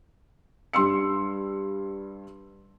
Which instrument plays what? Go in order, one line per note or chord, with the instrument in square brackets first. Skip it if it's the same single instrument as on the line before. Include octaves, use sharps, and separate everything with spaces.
[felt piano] G2 C6 E6 C#7